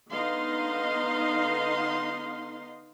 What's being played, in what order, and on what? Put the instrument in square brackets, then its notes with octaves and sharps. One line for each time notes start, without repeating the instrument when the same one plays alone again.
[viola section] D3 B3 D#4 D#5 F5 C6